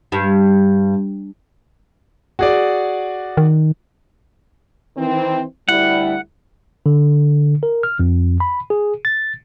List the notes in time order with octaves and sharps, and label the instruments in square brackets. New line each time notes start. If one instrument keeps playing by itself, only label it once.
[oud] G2
[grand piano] F#4 G#4 D5
[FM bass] D#3
[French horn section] D#3 E3 C4
[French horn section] D2 G3 E4 [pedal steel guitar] F#5
[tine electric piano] D3
A#4
F6
F2
B5
G#4
A6